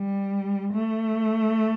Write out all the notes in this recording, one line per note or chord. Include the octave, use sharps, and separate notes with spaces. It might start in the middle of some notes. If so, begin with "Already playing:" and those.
Already playing: G3
A3